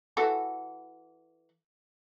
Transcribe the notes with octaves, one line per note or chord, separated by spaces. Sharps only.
E3 F#4 A4